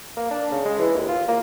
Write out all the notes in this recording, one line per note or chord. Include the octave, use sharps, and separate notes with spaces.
A#3
D4
C#3
G#3
E3
D#2
F4
A#3